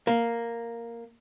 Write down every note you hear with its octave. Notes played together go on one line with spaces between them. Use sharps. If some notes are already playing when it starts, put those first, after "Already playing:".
A#3